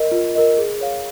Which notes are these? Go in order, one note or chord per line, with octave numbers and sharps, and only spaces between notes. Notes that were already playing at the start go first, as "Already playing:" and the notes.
Already playing: A#4 D#5
F4
A#4 D#5
G#4
C#5 F5